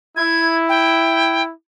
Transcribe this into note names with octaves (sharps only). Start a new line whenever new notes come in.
E4 G#6
G5